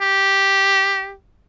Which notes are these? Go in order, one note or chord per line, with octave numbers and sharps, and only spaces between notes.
G4